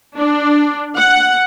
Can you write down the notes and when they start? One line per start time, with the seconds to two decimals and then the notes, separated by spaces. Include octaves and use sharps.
0.17 D4
0.97 F#5